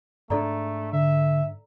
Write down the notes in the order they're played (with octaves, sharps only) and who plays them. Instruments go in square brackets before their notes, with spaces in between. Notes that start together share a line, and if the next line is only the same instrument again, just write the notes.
[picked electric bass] G#2 D4 [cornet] A3 [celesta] A4 D5 A#5
[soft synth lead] D3 [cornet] E5